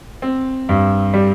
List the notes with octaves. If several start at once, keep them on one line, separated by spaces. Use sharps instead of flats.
C4
G2
G3